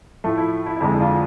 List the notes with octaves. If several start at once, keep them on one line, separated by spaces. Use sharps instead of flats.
A2 F3 A3
E4
E4
E4
F2 D3 G#3 D4
E4
D4 F4